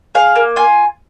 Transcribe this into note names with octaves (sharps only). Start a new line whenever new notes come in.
G#4 F5
A#3
F4 G#5